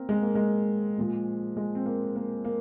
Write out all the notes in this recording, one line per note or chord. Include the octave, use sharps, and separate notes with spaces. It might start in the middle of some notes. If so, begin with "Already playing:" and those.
Already playing: A#3 C4 A#4
G#3
A#3
G#3
A#2 F3 G#3
G#3
C4
A#3
A#3
A#3